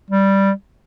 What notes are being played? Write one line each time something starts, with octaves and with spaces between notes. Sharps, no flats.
G3